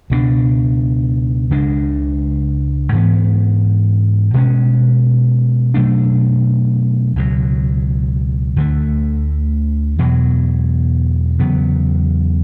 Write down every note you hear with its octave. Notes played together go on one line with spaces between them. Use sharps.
C#2 B2 G#3 D4
C#2 C#3 G#3 D4
G#2 E3 B3
B2 G#3 C#4
B2 F#3 A3 D4
C#2 B2 F#3
D2 D3 A3
E2 B2 F#3
E2 C#3 F#3 B3